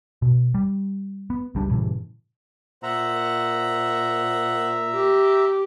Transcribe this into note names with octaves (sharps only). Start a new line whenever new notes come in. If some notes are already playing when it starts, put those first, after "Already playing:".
B2
G3
B3
C#2 G3 D4
G2 A#2 C#3 E3
A#2 C5 E5 F#5 A#5
G4